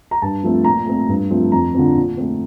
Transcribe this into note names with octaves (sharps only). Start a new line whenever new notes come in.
A#5
G2 A5
F3 A3 C4
A#2 A#5
A3 C4
G2
F3 A3 C4
F2 A#5
D3 F3 C4
A#2
A3 C4